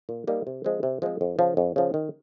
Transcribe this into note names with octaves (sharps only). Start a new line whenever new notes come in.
A#2
G3 A#3 D#4
C3
F3 G#3 C4
C3
F3 G#3 C4
F2
C#3 F3
F2
C#3 F3
D#3